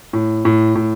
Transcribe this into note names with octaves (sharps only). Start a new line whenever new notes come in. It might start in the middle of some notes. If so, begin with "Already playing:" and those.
A2
A2
A2